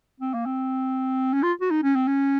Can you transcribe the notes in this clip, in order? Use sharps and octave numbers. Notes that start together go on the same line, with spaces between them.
C4
A#3
C4
C#4
F4
F#4
D#4
C#4
C4
C#4